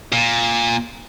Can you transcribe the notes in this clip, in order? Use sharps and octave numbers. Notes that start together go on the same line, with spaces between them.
A#2